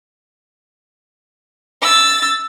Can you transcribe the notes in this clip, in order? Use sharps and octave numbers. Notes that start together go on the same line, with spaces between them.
E6 A6